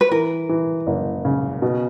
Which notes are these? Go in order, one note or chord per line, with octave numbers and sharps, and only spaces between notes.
B4
E3 A#4
E3
F#1
C#3
B2